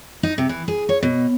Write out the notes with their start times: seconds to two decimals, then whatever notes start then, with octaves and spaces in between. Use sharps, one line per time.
0.23 D#4
0.38 C3
0.49 E3
0.68 G#4
0.89 C#5
1.03 B2